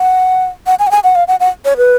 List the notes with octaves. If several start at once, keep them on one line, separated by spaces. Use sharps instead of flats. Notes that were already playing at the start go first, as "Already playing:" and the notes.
Already playing: F#5
F#5
G#5
F#5
G#5
F#5
F5
F#5
F#5
C#5
B4